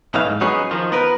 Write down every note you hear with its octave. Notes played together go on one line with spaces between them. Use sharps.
B1 A2 E3 D#4 F5
G#2
F#3 B3 C#4 D#4 F#4 G#4
D#3 F3 F4
B3 A#4 B4